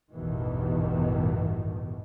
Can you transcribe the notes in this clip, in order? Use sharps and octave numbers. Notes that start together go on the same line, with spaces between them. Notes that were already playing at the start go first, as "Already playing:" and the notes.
A1 E2 G2 B2 D#3 E3